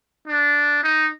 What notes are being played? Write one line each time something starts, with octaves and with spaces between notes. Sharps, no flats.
D4
D#4